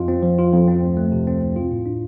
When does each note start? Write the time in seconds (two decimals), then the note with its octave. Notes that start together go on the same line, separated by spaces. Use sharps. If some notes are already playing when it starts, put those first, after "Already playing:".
Already playing: F2 F4
0.08 C4
0.23 F3
0.39 F4
0.53 F2
0.68 C4
0.82 D2
0.97 A3
1.12 C3
1.27 C4
1.41 D2
1.56 F4
1.71 A2
1.86 D4